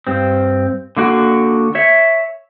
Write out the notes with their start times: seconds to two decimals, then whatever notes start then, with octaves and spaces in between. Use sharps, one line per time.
0.07 G2 C4
0.97 D3 A#3 F#4
1.75 C#5 E5